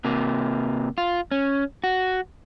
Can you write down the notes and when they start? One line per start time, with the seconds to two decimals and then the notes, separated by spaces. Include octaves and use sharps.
0.05 C3 A#3
0.98 F4
1.31 C#4
1.84 F#4